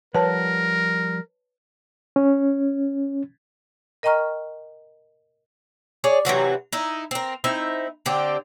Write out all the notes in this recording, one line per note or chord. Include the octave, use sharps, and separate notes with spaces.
F3 G3 A#4 B4 C#5 F#5 A5
C#4
A#4 D#5 G5 A#5 C#6 F6
G#4 C#5 D5
C3 E3 F#3 F#4
D#4 E4
C4 A#4
C4 D#4 E4 E5
D3 C4 G4